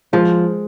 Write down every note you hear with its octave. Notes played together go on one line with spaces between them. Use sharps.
F3 G#3